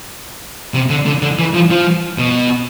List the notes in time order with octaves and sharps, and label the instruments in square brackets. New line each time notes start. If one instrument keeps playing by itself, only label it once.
[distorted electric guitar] C3
D3
D3
D3
E3
F3
F3
B2